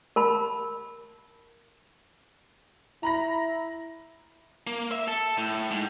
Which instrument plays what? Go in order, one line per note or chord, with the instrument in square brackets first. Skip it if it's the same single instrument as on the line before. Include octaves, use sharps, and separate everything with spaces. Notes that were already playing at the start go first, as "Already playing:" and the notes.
[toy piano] A#4 A5 B5
[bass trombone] E4 [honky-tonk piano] A#5 B5 A#6
[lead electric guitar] A#3
E5
A4
A2
G#2